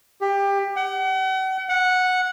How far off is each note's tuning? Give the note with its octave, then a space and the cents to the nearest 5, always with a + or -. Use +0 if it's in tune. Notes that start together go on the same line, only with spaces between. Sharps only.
G4 +20
F#5 +40
F#5 -10